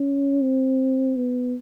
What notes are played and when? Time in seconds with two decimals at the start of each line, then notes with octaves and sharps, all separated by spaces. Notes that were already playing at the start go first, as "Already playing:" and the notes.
Already playing: C#4
0.42 C4
1.16 B3